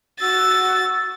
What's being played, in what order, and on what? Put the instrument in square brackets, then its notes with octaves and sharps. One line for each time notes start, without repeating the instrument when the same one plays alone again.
[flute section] F#4 E6 [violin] A6